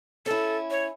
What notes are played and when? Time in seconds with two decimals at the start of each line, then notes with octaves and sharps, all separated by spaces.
0.26 C#4 E4 A4
0.71 C#5